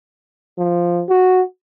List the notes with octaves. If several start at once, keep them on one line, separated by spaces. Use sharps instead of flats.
F3
F#4